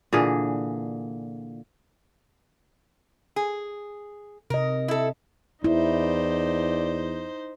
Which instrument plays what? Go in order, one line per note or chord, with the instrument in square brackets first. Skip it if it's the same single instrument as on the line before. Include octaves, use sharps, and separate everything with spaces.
[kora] A#2 D3 E3 G#4
[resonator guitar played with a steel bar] G#4
[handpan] C3 D#5 [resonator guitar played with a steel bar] A#4
[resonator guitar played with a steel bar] E4 A4
[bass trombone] E2 [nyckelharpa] D#4 C5 [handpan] E4 [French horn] D5